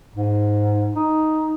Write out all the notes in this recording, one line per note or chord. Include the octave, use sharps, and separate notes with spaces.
G#2
D#4